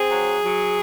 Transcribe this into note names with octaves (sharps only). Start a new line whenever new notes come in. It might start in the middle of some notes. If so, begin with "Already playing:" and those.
Already playing: C4 G#4
F#3
F#3